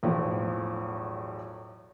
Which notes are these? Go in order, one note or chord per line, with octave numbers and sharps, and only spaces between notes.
B1 E2 A2 F3